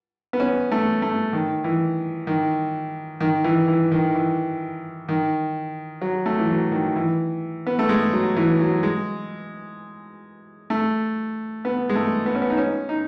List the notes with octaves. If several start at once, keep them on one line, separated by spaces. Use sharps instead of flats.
B3
C#4
A3
A3
D#3
E3
D#3
D#3
E3
E3
D#3
E3
D#3
F#3
A3
E3
F#3
D#3
E3
B3
A3
G#3
F#3
E3
F#3
G#3
A3
B3
G#3
A3
B3
C#4
B3
D#4
C#4
D#4